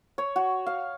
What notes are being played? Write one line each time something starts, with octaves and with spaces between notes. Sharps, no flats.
C#5
F#4
F5